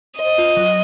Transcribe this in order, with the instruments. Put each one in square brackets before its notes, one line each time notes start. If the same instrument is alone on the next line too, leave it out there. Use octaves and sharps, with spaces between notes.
[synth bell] C5 [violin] D#5
[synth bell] F4
F#3